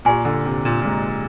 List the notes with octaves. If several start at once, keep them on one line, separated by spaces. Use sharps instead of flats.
A#2 G4 D5 F5 G#5 C6
D3
C3
A#2
A#2
G#2